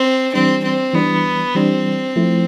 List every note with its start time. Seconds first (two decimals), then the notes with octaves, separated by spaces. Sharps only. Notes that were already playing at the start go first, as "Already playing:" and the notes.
Already playing: C4
0.33 E3 G3 C4 D4
0.63 C4
0.93 E3 G3 B3 D4
1.55 E3 G3 C4 D4
2.16 F3 A3 E4